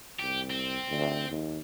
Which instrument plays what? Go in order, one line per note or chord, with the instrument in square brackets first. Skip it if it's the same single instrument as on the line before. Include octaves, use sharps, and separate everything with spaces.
[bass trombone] C2 [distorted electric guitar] G4
[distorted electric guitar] C4
[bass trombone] D2
D#2